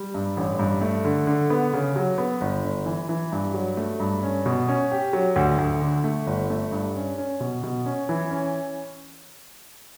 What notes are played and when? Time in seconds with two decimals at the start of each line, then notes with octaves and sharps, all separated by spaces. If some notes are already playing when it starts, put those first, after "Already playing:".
Already playing: G3
0.15 G2
0.37 A1
0.59 G2
0.81 A3
1.05 D3
1.27 D3
1.50 B3
1.73 C#3
1.96 F#3
2.18 B3
2.41 G1
2.64 G1
2.86 E3
3.09 E3
3.32 G2
3.54 F#3
3.77 A3
4.00 G2
4.23 C#4
4.46 B2
4.68 C#4
4.91 G4
5.13 F#3
5.36 D2
5.58 D2
5.82 D3
6.04 A3
6.27 G1
6.50 A3
6.72 G2
6.95 C#4
7.18 C#4
7.40 B2
7.63 B2
7.86 C#4
8.09 E3
8.31 C#4